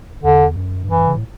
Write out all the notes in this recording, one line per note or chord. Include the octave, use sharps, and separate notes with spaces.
E2 D3
F#2
G2
F#2 E3
G2
C#3
A2